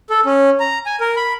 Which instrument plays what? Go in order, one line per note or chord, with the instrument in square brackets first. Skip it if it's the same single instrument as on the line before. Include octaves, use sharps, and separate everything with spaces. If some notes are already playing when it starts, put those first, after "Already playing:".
[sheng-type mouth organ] A4
C#4
A#5
G#5
A#4
B5